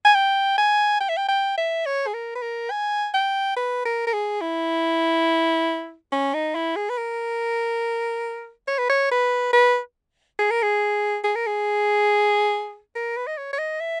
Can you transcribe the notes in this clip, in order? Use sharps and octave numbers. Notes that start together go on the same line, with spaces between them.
G#5
G5
G#5
G5
E5
G5
G5
E5
C#5
G#4
A#4
B4
A#4
G#5
G5
B4
A#4
A#4
G#4
E4
C#4
D#4
E4
G#4
B4
A#4
C#5
B4
C#5
B4
B4
G#4
A#4
G#4
G#4
A#4
G#4
A#4
B4
D#5
C#5
C#5
D#5
E5